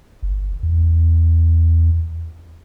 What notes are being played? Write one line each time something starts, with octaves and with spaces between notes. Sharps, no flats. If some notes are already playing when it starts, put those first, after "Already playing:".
G1
E2